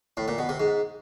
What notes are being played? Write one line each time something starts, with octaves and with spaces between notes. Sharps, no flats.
A2
A#2
B2
C3
G#2